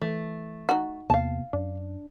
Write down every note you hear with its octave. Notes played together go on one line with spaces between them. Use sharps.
E3 A3
D#4 F#4
E2 C3 A#3 B3 F5 A5
F#2 D4